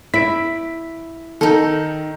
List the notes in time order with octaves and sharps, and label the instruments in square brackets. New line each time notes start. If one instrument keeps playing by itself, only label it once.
[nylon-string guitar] E4 [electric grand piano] B6 D7
[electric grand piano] D#3 [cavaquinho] D#4 A4